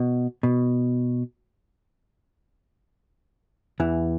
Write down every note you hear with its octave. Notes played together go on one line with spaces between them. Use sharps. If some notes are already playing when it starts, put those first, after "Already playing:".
Already playing: B2
B2
E2 E3